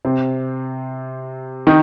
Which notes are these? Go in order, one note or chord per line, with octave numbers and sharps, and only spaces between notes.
C3 C4
D#3 D#4